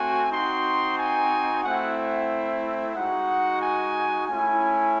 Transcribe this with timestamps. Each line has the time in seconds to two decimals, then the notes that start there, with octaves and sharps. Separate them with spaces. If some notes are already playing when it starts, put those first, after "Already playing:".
Already playing: A3 C4 F#4 G#5
0.30 C4 D#4 F#4 C6
0.97 G#5
1.63 A3 C4 E4 F#5
1.96 E5
2.95 G#3 D#4 F#4 F#5
3.61 G#5
4.27 A3 C#4 E4 G#5